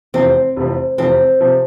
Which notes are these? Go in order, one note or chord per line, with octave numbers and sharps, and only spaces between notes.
F1 E2 C3 F3 C4
F1 E2 C3 F3
F1 E2 C3 F3 C4
C3 F3